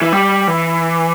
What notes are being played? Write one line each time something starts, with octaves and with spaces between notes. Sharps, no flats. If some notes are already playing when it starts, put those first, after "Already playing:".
E3
G3
E3